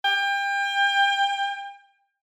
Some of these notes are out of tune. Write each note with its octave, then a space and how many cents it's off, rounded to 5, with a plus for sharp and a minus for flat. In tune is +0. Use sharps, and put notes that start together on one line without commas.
G5 +30